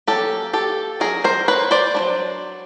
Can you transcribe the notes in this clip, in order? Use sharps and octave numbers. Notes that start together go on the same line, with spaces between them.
F#3 A#3 C#4 G4 A4
G4 A4
F#3 A3 C#4 G#4 A#4
A#4 C5
B4 C#5
C5 D5
F#3 B3 D4